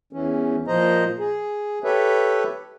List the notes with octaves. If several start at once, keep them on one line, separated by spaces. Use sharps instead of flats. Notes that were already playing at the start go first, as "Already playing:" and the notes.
E2 E3 C#4
A#2 F3 C5 D#5 A#5
G#4
G4 A4 B4 C#5 E5